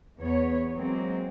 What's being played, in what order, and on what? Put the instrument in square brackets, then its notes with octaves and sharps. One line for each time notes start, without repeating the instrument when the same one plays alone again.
[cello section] E2 B3 C#5
F#3 G#3 A#3 C4